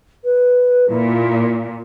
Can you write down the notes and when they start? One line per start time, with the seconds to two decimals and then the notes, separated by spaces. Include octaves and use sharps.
0.24 B4
0.89 A#2 E4